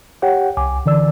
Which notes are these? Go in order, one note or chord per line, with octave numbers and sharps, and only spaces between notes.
G4 C#5 F#5 G5
C2 G#5 D6
D3 E3 D5 E6